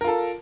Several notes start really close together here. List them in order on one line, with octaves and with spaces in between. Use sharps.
A#4 F4 A4